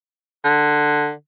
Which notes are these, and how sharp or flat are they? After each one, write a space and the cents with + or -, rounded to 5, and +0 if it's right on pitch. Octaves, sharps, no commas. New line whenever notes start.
D3 +15